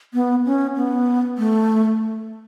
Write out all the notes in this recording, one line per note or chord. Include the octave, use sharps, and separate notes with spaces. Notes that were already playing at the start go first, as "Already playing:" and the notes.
B3
C#4
B3
A3